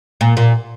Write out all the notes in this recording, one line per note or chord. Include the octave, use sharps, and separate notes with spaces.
A#2
A#2